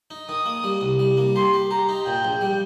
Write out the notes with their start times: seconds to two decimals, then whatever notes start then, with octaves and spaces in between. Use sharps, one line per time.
0.11 D#4
0.29 D#3 D#6
0.46 A#3
0.64 G3
0.81 C2
0.99 G3
1.17 A#3
1.36 G4 C6
1.54 G4
1.71 G4 A#5
1.89 D#4
2.06 A#2 G5
2.25 A#1
2.41 G3